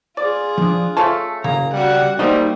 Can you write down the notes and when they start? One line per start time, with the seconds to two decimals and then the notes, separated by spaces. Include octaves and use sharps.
0.17 F4 G#4 D5
0.58 F3 D4
0.97 A3 C#4 F4 A4 A5
1.44 F#1 C#3 A#3 A#5
1.73 G3 F#4 F#5
2.19 G3 A3 A#3 D#4 C5 D#5